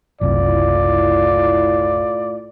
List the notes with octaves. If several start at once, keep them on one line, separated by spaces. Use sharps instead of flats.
F#1 C2 A2 E4 F4 D5